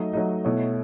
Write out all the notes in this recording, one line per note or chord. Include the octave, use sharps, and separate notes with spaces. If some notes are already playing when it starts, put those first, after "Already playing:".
Already playing: F#3 A3 D#4 D#5
F#3 A3 D#4
B2 A3 E4 C#5